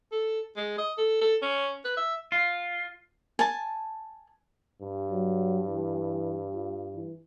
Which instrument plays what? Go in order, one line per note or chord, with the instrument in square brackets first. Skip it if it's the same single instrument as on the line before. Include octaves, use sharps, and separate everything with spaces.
[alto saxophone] A4
G#3
D#5
A4
A4
C#4
B4
E5
[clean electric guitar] F4
[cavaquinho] G#5 A5
[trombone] G2
[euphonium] F#3
E3
F4
E3